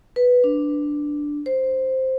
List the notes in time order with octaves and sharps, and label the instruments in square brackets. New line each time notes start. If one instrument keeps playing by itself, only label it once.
[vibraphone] B4
D4
C5